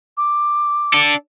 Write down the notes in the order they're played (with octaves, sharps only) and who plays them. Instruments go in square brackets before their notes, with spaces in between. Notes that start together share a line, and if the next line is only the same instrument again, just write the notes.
[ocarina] D6
[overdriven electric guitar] D4 A4